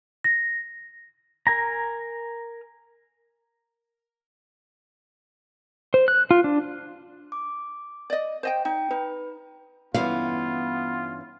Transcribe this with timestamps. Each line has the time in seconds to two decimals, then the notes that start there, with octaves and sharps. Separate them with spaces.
0.24 A#6
1.47 A#4 G#5 A#5
5.94 C5
6.08 F#6
6.31 F4
6.44 D4
7.32 D6
8.10 D5 D#5
8.43 C5 D#5 G5
8.65 D#4 G5
8.91 D#4 B4
9.94 G2 E3 B3 C#4 F4 F5